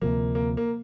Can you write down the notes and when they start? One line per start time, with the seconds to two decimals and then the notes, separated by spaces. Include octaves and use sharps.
0.02 D2 C3 F3 A#3
0.35 A#3
0.57 A#3